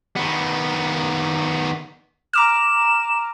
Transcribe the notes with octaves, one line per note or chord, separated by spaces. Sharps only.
D#3 B3
A#5 D6 F6 E7